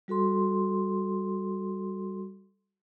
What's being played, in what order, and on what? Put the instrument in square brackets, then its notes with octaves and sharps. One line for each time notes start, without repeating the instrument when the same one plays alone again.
[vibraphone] G3 F#4 A4 C6